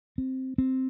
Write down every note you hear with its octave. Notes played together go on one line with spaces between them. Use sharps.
C4
C4